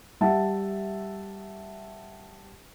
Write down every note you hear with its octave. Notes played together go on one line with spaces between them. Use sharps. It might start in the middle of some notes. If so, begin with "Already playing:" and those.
G3 E5 F#5 A5